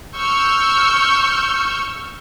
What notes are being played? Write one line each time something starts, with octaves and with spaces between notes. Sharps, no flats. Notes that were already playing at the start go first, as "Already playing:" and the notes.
C#6 E6 F6 G6